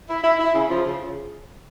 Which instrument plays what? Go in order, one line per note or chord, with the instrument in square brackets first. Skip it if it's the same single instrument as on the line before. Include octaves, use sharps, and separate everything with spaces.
[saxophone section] E4
E4
E4
C#3
F3
C#3